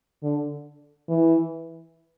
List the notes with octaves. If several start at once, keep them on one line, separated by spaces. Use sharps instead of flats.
D3
E3